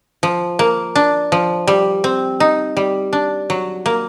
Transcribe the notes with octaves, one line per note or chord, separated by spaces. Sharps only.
F3
A#3
D4
F3
G3
C4
D#4
G3
D4
F#3
A#3